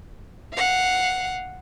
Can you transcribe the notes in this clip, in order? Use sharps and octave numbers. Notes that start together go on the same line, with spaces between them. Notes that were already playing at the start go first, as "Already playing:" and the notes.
F5 F#5